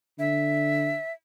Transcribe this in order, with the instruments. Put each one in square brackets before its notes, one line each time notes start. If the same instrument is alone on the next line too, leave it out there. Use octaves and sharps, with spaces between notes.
[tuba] D3 [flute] E5